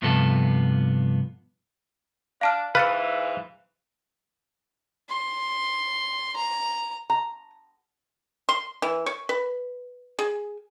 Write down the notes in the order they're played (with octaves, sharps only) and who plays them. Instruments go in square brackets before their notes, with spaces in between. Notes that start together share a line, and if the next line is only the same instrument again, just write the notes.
[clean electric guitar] G2 C3 F3 B3 A4
[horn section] D4 [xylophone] F5 A5 F6
[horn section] G#2 E3 [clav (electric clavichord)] B4 [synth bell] F5 F#6 [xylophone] F6 A6 C#7
[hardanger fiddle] C6
A#5
[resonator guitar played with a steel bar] A#5
[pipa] C6
E3
C#5
B4
G#4